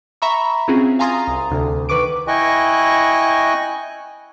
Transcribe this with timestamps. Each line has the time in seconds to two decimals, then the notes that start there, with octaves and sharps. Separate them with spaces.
0.22 E5 A#5 B5 C#6
0.68 C4 C#4 F4 F#4 G#4
0.99 F5 G#5 A#5 C6 D#6 A6
1.28 C2
1.51 D2 C3
1.89 D#3 B4 C#6 D6 D7
2.28 E4 D#5 G5 G#5 C#6 F#6